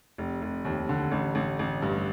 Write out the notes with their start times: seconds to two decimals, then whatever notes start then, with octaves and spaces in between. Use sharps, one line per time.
0.18 F1
0.42 F1
0.65 D#2
0.89 D3
1.12 A1
1.35 A1
1.59 A1
1.82 G2